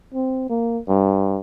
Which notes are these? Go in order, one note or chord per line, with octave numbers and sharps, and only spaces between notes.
C4
A#3
G2